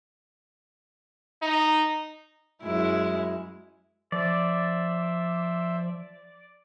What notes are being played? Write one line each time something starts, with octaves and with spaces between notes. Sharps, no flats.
D#4
F#2 G#3 E4
F3 C5 D5 E5